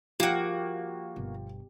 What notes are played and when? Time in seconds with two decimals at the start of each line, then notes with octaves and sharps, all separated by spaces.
0.20 F3 A#3 F#4 G4
1.16 G1 B2